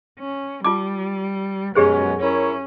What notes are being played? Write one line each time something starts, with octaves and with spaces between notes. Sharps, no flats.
C#4
G3 F4 A5 D6
F#2 B2 F#3 G#3 C#4 G4 G#4 C5
C#4 E4 A#4 C#5